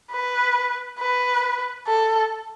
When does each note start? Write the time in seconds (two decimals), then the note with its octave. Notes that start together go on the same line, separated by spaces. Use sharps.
0.12 B4
1.00 B4
1.88 A4